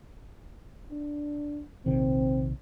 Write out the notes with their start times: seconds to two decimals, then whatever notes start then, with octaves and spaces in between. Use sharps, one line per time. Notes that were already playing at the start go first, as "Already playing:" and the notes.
0.91 D4
1.86 A#1 C3 D#3 C4